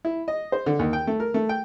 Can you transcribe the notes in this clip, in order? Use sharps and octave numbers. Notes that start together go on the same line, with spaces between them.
E4
D#5
C5
D3
D#2
G5
A3
A#4
A3
G5